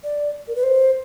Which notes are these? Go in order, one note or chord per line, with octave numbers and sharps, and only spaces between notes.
D5
A#4
B4
C5